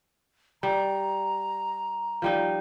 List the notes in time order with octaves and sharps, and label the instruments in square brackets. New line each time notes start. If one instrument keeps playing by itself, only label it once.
[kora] G3 [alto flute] A#5
[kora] F3 G3 D#4